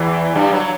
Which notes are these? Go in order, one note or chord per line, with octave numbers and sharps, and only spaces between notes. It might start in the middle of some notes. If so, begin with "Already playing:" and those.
Already playing: E2 E3
G2 G3
F#3